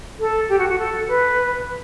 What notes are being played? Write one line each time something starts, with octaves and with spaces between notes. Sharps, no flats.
A4
G4
F#4
F#4
A4
B4